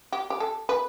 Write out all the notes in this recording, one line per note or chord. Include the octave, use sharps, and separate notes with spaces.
G4
G4
A4
B4